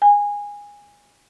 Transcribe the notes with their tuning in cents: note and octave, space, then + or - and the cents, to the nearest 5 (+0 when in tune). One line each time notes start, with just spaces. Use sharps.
G#5 -15